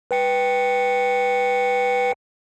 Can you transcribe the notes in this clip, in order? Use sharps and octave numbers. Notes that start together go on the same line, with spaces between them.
B4 G5 C#7